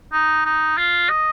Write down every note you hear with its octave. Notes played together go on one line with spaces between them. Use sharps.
D#4
D#4
F4
D#5